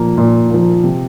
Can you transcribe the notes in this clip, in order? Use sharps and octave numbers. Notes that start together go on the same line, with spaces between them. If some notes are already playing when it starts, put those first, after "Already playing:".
Already playing: A#2 F3 A#3
A#2
F3 A#3
C3